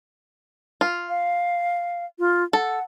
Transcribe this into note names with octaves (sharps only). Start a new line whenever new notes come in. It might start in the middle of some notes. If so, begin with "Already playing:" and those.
F4
F5
F4
A4 F#5